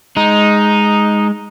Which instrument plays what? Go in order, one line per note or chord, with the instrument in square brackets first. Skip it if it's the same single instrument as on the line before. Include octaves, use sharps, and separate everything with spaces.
[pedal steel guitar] G#3 [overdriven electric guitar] D#4